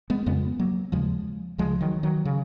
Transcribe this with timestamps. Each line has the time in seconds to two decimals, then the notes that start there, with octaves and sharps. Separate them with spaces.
0.10 G#3 B3
0.26 F2 C#3 G#3 B3
0.59 F#3 A#3
0.92 D#2 C#3 F3 G#3
1.58 C#2 C#3 F3 G#3
1.81 D#3 F#3
2.03 D#3 F#3
2.25 C#3